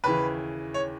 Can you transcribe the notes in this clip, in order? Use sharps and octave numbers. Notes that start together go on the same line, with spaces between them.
D#2 C#3 E3 B4
C#5